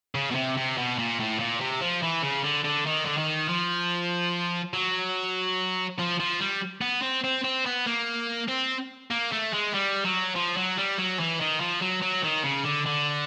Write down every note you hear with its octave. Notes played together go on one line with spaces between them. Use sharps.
C#3
B2
C3
C3
B2
A#2
A2
A#2
C3
F3
E3
C#3
D3
D3
D#3
D3
D#3
F3
F#3
F3
F3
G3
B3
C4
C4
C4
B3
A#3
C4
A#3
A3
G#3
G3
F#3
F3
F#3
G3
F#3
E3
D#3
F3
F#3
F#3
D#3
C#3
D3
D3